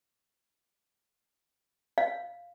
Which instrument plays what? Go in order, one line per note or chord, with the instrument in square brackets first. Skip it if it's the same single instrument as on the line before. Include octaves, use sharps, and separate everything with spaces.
[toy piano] F5